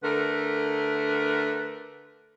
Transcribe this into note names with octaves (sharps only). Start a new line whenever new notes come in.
D3 A3 A#4 B4